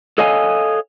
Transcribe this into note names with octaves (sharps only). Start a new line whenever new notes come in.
A4 C#5 D#5 F5 G#5